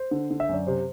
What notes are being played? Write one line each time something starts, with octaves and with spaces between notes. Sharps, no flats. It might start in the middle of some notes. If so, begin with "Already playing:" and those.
Already playing: C5
D3
D3
E5
F#2 D5
C3 C5